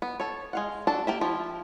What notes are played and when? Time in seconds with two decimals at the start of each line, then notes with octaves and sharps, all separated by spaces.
0.02 B3
0.20 A4 C#5
0.53 G#3 F5 F#5
0.87 D4 F#4 A4 A5
1.07 A#3 G4 E5
1.21 F3 E4